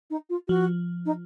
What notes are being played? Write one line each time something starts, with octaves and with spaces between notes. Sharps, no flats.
D#4
F4
F3 F#4
D#4